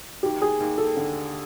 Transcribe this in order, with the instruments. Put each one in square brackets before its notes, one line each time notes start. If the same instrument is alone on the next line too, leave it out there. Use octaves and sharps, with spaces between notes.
[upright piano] D#2 [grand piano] G4
[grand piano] G#4
[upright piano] D#2
[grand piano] A4
[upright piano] D3